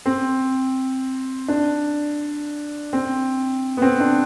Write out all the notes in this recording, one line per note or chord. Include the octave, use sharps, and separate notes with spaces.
C4
D4
C4
B3
C4
D4